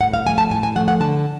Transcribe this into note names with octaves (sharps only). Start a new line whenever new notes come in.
A2 F#5
F5
F3 A3 G#5
A5
A2 G#5
G#5
F3 A3 F#5
F#5
D3 A5